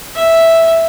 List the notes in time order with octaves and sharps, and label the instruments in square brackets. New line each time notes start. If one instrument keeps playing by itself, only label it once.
[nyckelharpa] E5